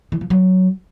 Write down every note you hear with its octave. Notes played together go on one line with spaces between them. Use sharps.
E3
F3
F#3